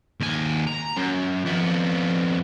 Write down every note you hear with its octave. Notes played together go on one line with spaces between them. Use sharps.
D#2 G#5
A#5
F#2
F2 B3